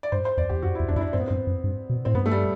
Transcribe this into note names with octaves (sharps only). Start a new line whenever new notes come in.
D5
G2 C5
C5
E2 D5
E2 G4
F#2 F#4
E2 E4
E2 D4
F#2 E4
D4
G2 C4
B3
G2 C4
F#2
G2
B2
A2 C4
G2 B3
A3
G3